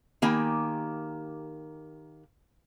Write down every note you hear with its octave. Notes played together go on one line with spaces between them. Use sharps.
D#3 A#3 G4 G#5